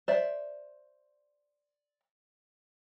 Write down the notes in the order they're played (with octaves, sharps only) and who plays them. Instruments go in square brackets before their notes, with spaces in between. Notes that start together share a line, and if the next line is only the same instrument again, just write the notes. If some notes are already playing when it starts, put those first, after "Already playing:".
[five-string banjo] C5 D5 E5